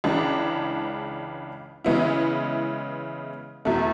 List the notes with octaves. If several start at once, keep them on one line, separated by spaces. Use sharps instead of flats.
C#2 C#3 E3 G#3 D4
C#3 E3 G#3 B3 E4
E2 B2 A3 E4